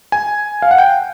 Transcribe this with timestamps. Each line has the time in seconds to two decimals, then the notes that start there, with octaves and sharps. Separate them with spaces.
0.12 G#5
0.62 F5
0.71 F#5
0.78 G5